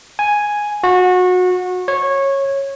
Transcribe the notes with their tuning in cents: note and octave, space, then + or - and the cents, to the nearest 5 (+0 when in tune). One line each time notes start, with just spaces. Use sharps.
G#5 +0
F#4 -25
C#5 -15